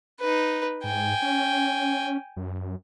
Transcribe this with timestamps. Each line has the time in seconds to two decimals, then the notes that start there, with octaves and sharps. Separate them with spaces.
0.20 D#4 B4
0.84 G#2 G5 G#5
1.22 C#4
2.37 F#2